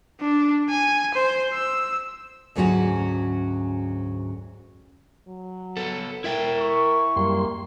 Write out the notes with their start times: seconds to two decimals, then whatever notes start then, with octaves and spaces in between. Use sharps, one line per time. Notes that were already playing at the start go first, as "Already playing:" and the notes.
0.21 D4
0.69 G#5
1.14 C5
1.53 E6
2.55 D2 G#2 F#3 C#4 F#4 F#5
5.27 F#3
5.77 B3 A4
6.24 E4 A#4 E5 G5
6.58 C#6
7.16 F#2 G3 A#3 C6